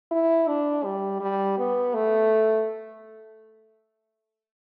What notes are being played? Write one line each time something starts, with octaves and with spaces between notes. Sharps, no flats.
E4
D4
G3
G3
B3
A3